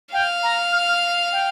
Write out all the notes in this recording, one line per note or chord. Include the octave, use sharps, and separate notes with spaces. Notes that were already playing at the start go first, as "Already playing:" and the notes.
F5 G5
A#5
F6
F6
G5